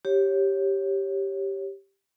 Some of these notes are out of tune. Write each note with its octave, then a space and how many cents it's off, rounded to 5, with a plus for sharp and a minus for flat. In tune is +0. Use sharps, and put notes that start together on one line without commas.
G4 +0 C#5 -15